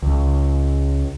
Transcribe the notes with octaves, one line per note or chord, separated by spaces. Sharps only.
C#2